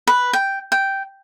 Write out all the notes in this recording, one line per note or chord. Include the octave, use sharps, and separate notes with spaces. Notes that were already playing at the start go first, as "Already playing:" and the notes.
B4
G5
G5